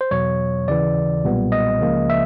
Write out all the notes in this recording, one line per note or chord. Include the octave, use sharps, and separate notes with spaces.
C5
E2 B2 F#3 C#5
D#2 C#3 E3 D5
B1 A#2 G3 B3
D#5
C#2 C#3 F3 A#3
E5